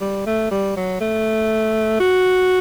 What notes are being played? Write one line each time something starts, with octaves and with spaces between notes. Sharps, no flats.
G3
A3
G3
F#3
A3
F#4